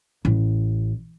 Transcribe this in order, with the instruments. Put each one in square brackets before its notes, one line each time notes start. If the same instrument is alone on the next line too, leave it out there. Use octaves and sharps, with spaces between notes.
[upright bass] A1